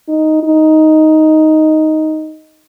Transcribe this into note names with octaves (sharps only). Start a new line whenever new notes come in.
D#4
D#4